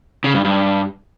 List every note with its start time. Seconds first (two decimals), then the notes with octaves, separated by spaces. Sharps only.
0.24 C#3
0.34 G2
0.45 G2